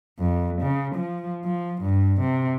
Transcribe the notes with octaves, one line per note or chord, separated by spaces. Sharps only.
F2
C#3
F3
F3
G2
C3